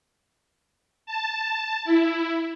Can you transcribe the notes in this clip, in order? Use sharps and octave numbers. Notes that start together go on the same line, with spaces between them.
A5
E4